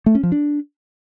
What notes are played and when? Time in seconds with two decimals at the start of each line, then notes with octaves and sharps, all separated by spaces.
0.06 A3
0.15 C#4
0.23 F3
0.32 D4